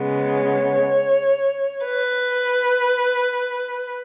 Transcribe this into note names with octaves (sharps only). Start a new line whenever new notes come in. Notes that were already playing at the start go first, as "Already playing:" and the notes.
Already playing: C#3 G#3 B3
C#5
B4